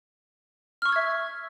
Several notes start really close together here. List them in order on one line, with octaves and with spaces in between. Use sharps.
F6 C#6 E6 G#6 E5